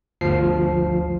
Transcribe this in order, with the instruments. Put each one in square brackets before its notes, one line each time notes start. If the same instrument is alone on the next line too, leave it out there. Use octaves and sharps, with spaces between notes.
[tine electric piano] G1 D2 F3 C7